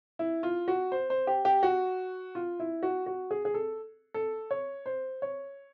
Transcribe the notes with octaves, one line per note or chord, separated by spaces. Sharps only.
E4
F4
F#4
C5
C5
G4
G4
F#4
F4
E4
F#4
F#4
G#4
G#4
A4
A4
C#5
C5
C#5